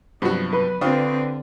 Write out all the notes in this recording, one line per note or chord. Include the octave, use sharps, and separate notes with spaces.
G2 C3 F3 F#3 B3 F#4
B4
D3 C4 D4 F4 G4 C5 C#6 D#6